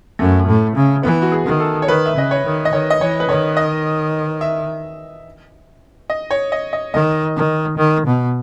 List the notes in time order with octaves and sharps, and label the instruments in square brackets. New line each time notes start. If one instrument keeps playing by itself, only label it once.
[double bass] F#2 [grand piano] A3
[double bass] A2
C#3
[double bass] E3 [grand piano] B3
[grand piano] F#4
G#4
[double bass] D#3
[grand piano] A4
C#5
[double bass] D#3 [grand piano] B4
[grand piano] E5
[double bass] C#3 [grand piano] D#5
[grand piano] C#5
[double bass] D#3
[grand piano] D#5
[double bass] D#3 [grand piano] C#5
[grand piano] D#5
[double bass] E3 [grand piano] C#5
[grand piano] B4
[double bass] D#3 [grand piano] C#5
[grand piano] D#5
E5
D#5
C#5
D#5
D#5
[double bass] D#3 [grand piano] D#5
[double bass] D#3
D#3
B2